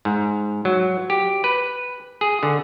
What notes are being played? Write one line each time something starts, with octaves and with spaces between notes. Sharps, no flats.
G#2
F#3
G4
B4
G#4
D3